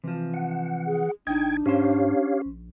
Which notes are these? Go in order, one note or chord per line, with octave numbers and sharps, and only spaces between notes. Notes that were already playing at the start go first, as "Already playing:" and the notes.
C3 E3 F3
F#5
G#4
A1 D4 D#4 D#5 G5 G#6
G#2 C#4 G4 C5 C#5 F5
A#1